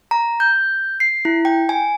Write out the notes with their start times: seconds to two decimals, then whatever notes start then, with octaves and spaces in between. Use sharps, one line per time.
0.11 A#5
0.40 G6
1.00 C7
1.25 E4
1.45 G5
1.69 G#5